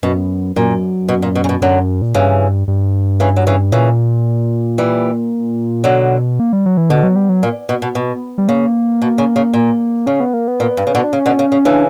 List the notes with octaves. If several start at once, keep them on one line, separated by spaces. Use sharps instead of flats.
F#2 B2
F#2 A#2
B2
A#2
B2
C#3
B2
F#2 D3 F#3
A#2
G2 C#3 E3
G2
C#3 E3
F#3
C#3 E3
A#2 C#3 E3
E3 G3
B2 D3 F#3
A#3
G3
F#3
E3
B2 D3
F#3
G3
F#3
A#2
B2
B2
B2
G3
C#3 A#3
B2
C#3
C#3
A#2
C#3 C#4
B3
A#3
B3
A#2
G2
C#3
B2 D3
D4
C#3 C#4
B2 D3
C#3
C#3
C#3 E3 D4